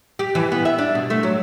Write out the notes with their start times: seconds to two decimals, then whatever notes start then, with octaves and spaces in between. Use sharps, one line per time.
0.19 G4
0.35 E3
0.52 B3
0.65 E5
0.78 D4
0.95 B2
1.10 A3
1.23 F#3